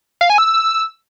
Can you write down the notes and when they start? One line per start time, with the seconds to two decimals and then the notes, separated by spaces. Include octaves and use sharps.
0.21 F5
0.30 G#5
0.38 E6